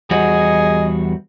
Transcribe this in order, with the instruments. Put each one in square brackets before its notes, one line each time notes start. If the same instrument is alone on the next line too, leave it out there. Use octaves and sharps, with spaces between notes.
[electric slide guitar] E2 G3 F#4 [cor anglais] G#4 [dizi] D#5